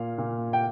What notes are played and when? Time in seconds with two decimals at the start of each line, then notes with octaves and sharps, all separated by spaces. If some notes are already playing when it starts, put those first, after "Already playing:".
Already playing: A#2 F5
0.18 A#2
0.53 G5